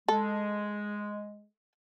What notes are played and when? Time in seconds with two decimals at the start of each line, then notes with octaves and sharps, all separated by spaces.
0.08 G#3 A4